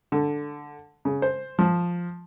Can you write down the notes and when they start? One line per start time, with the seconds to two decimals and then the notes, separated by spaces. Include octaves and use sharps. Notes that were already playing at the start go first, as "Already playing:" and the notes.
0.12 D3
1.05 C#3
1.22 C5
1.59 F3